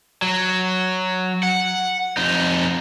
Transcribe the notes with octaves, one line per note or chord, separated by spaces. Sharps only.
F#3
F#5
F2 D#4